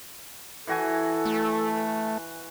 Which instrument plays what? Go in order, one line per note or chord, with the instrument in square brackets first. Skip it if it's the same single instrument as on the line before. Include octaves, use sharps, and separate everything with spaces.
[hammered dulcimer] E3 F#4 G#5 [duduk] A4
[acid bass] A3